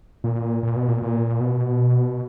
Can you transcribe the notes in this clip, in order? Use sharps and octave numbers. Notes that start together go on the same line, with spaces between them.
A#2
A#2
B2
A#2
A#2
B2